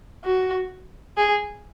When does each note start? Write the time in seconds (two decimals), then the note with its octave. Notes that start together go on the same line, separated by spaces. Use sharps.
0.24 F#4
1.17 G#4